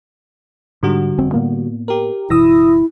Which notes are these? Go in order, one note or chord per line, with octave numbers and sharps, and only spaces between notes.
G#2 D3 G3 F#4
F#1 F2 C4
A2 A#3 B3
G4 A#4
F#1 B2 E3 E4 D#6 E6 A#6